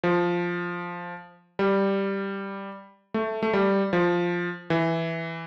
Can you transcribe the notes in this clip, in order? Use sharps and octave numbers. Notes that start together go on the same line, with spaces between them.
F3
G3
A3
A3
G3
F3
E3